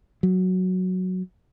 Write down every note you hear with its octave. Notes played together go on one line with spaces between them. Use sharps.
F#3